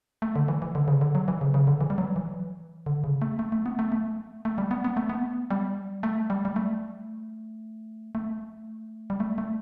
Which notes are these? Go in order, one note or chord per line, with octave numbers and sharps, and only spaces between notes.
A3
D3
E3
E3
D3
C#3
D3
F#3
E3
C#3
C#3
D3
E3
G3
F#3
E3
D3
C#3
A3
A3
A3
B3
A3
A3
A3
G3
B3
B3
A3
B3
G3
A3
G3
G3
A3
A3
G3
A3
A3